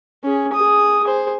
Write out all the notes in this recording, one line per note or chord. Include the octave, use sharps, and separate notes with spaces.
C#4 G#4
G#4 D#6
G#4 C5